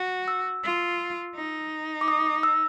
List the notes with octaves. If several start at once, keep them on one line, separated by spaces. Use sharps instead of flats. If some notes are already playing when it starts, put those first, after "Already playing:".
Already playing: F#4
E6
F4 E6
D#4
D6
D#6
E6